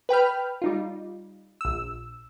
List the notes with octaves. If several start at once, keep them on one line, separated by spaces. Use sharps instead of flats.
B4 G5 B5 F6
G3 D#4 F4
A#1 E6